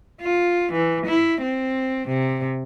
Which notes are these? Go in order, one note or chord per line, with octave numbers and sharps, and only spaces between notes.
F4
E3
E4
C4
C3